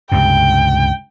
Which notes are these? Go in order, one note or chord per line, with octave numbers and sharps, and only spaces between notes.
C#2 G2 C3 G5